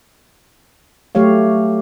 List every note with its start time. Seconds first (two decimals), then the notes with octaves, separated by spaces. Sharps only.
1.15 F#3 A3 G4 C#5 F5